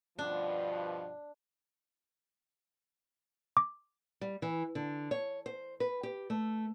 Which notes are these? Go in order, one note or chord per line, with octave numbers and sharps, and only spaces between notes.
G2 B2 F3 D4
D6
G3
E3
D3
C#5
C5
B4
G4
A3